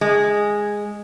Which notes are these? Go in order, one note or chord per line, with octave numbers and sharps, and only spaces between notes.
G#3